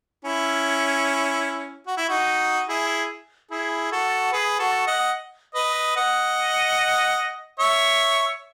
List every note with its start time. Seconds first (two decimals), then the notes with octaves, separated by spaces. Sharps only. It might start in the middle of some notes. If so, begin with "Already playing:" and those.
0.25 C#4 E4
1.87 F#4
1.97 E4
2.08 D#4 F#4
2.69 E4 G#4
3.51 E4 G#4
3.92 F#4 A4
4.32 G#4 B4
4.59 F#4 A4
4.87 D#5 F#5
5.54 B4 D#5
5.96 D#5 F#5
7.59 C#5 E5